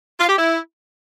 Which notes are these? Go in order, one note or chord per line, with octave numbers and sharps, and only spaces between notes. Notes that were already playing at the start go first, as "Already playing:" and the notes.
F4
G4
E4